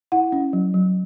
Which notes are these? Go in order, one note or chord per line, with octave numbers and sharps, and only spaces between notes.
E4 F#5
C#4
F#3
F#3